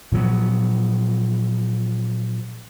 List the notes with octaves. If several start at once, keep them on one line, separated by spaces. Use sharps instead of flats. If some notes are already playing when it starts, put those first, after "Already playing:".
A#2 F3 F#3 B3